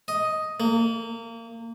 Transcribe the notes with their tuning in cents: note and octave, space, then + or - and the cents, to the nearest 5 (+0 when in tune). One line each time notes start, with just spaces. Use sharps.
D#5 +5
A#3 -30